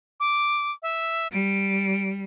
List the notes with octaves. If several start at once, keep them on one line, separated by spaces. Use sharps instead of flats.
D6
E5
G3 D7